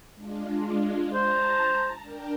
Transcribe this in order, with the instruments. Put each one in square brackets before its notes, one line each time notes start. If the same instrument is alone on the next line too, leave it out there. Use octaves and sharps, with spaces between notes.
[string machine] G#3 D4 F4
[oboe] C5 [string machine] A5 A#5
[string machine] D4 A#4 G5